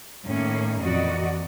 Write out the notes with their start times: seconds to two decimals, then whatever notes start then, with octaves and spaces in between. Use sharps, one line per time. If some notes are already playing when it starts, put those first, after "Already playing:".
0.23 A2 D#3 A#3 C#4
0.80 F2 A#2 E3 F#4 D5 D#5